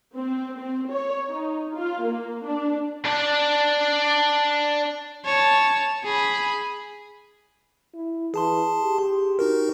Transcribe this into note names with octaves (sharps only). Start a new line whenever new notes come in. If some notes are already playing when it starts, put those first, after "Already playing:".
C4
C4
C#5
D#4
F4
A#3
D4
D4 D5
C#5 A5
G#4 B5
E4
E3 G#4 A5 C6
G4
D#4 F#4 A#4